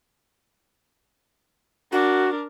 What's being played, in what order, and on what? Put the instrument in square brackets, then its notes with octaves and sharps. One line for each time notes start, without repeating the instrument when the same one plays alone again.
[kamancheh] D4 A#4 [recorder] F#4